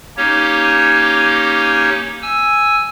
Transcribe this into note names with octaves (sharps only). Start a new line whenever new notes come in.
A#3 C#4 D#4 G4 C#5
G#5 E6